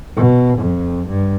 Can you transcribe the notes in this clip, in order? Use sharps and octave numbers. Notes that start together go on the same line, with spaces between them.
B2
F2
G2